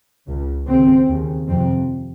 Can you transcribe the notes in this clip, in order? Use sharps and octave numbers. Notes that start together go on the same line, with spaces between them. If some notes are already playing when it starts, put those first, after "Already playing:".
C#2 C#3
D#2 C#3 C4
D#2 C#3
F2 C3 C4